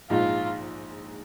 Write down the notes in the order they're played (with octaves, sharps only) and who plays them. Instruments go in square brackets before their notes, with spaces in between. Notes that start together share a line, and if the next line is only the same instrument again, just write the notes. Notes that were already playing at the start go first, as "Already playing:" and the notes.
[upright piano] A#1 G#2 F3 G#3 D#4 [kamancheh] F4